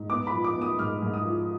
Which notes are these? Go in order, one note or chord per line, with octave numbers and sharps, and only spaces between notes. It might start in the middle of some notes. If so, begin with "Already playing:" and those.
Already playing: G#2
B3 D6
B5
F3
D6
B3
D#6
G#2 F6
G#2
D#6
F3